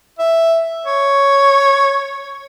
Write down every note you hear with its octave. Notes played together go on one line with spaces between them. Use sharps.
E5
C#5